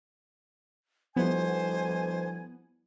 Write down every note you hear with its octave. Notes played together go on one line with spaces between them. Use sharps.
D2 B2 F3 G3 B3 E4 C5 G#5